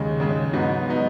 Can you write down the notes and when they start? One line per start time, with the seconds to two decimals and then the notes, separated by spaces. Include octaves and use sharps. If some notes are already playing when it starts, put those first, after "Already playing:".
Already playing: D#2 C#3 G#3
0.20 D#2 C#3 G#3
0.53 G#2 F#3 B3 D#4
0.88 F#3 B3 D#4